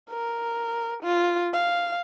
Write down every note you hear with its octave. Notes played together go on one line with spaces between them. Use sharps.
A#4
F4
F5